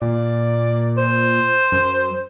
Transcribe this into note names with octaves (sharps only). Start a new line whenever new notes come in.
A#2 D5
C5
F#2